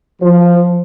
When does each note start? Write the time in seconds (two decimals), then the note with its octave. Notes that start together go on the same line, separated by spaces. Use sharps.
0.22 F3